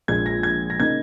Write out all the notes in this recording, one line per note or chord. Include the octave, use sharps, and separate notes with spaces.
A#1 A#2 G#3 G#6
A#6
G#6
A#6
C#3 A#3 D#4 G#6